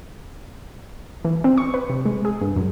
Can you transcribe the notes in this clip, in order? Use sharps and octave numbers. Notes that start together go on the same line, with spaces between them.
E3
C4
C#6
B4
C3
G#3
G#4
G2
F#2